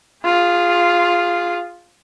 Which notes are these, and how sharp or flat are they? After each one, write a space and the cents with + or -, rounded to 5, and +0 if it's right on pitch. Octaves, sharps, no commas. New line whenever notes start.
F4 +0 G#4 -20